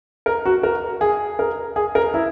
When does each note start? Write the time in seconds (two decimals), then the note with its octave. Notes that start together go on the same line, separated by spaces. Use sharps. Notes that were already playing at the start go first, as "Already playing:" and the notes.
0.26 A#4
0.45 F#4
0.63 A#4
1.01 G#4
1.39 A#4
1.76 G#4
1.95 A#4
2.14 E4